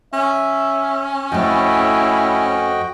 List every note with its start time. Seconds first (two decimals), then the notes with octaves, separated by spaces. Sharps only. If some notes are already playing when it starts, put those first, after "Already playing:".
0.13 C#4 E5
1.32 F2 A3 E4 F#4 D#5 G5